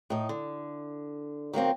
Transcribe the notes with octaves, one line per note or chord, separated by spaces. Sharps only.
A2 D#4
D3
D#3 F#3 A#3 C4